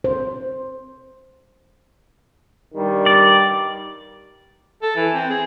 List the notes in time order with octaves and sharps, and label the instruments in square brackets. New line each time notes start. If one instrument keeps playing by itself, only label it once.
[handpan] C5
[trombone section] G2 D#3 G3
[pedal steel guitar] D5
[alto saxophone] A4
E3
C4
G#4